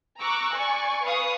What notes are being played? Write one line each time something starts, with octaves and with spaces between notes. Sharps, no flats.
A#5 C#6 D6 E6 F#6
D5 G#5 C#6
B4 F5 C#6 D#6